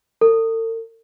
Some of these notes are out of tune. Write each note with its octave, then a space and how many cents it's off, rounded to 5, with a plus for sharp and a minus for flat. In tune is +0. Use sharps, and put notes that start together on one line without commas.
A4 +45